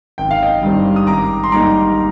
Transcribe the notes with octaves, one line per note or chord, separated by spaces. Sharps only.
G#1 G5
F5
D#5 G5
G2 D#3 G3 C4
D#6
G#1 A#5 D6
C6
G#2 G3 A#3 D#4 A#5 D6